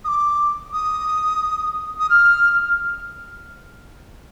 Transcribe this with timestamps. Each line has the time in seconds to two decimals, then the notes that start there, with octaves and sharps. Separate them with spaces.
0.04 D#6
0.07 D6
0.73 D#6
1.99 D#6
2.09 F6